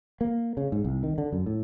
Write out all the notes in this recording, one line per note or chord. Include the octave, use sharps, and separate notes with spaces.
A#3
C#3
G#2
C2
D#3
D3
F#2
A2